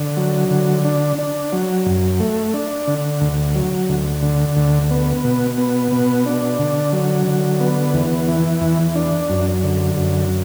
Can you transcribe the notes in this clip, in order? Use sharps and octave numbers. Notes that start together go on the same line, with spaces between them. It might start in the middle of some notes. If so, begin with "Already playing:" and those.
Already playing: D3
F#3
D3
D4
D4
F#3
F#2
A3
D4
D3
D2
F#3
D2
D3
D2
B3
B2
B3
B2
D4
D3
F#3
D3
B3
E2
E3
E2
D4
F#2
D3
F#2